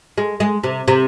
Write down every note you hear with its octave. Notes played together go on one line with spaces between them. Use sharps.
G#3
G#3
C3
C3